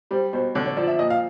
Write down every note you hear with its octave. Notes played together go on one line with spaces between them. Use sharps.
G3 C5
B2 C5
D3 C#5
C#5
F3 D5
E5
A#2 D#5
F5